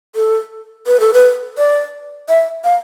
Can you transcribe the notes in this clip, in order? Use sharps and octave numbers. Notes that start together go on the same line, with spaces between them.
A4
B4
A4
B4
D5
E5
F5